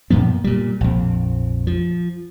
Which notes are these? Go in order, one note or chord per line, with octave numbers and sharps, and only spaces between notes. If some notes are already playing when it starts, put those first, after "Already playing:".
F#2 A#2 F3 B3
A#2 G3
A#1 F2
F3